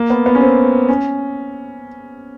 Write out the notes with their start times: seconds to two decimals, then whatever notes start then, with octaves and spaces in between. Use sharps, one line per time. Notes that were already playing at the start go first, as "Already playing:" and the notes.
Already playing: A#3
0.10 B3
0.26 B3
0.35 C#4
0.41 C4
0.89 C#4